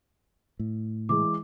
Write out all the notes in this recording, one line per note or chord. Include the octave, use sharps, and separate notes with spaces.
A2
E3 G#3 D6